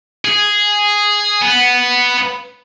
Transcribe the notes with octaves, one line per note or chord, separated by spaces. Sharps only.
G#4
B3